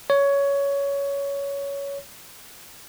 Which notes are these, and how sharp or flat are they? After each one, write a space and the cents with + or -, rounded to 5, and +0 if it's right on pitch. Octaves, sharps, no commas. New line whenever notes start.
C#5 +15